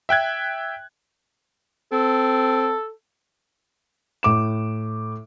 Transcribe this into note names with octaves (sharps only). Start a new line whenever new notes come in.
E5 G5 F#6 G#6
C4 A4
A2 D6 E7